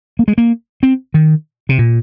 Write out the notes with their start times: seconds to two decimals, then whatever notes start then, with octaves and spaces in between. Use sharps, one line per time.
0.19 A#3
0.28 G#3
0.38 A#3
0.83 C4
1.14 D#3
1.69 C3
1.79 A#2